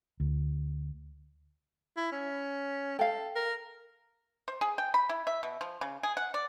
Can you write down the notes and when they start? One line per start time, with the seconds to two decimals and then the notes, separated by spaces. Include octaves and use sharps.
0.20 D2
1.97 E4
2.12 C#4
2.99 A4 F5 G5
3.35 A#4
4.48 C5
4.61 G#4
4.78 G5
4.94 B5
5.09 E4
5.27 E5
5.43 B2
5.61 F3
5.81 C#3
6.03 G#4
6.17 F#5
6.34 D5